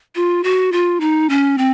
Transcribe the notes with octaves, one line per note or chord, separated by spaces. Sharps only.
F4
F#4
F4
D#4
C#4
C4